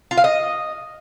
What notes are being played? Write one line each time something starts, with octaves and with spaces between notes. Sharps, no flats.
F4
F5
D#5